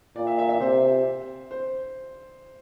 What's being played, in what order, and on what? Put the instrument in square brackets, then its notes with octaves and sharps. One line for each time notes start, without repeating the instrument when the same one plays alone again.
[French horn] A#2 [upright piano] D5
[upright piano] E5
E5
E5
[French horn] C3 [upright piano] C5
[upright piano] C5